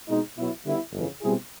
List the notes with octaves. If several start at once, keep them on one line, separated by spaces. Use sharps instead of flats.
B2 G#3 C4 D#4
B2 F#3 B3 E4
D3 G3 B3 E4
G1 F2 C#3 E3
B2 G3 C4 E4 G#4